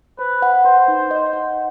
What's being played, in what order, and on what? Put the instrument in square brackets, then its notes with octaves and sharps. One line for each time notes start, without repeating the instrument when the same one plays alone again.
[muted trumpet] B4 [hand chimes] C5
[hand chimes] F#5
[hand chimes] B4 [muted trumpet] C5
[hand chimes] D#4
D#5
F#5